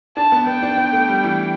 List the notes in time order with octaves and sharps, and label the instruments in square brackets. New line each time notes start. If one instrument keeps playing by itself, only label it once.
[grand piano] D4 [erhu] A5
[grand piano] B3
[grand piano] B3 [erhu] G5
[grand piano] D4
B3
A3
G3
E3